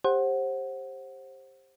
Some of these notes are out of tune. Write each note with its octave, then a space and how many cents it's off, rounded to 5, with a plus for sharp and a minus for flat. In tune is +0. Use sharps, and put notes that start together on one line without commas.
G4 +15 C5 +25 F#5 +0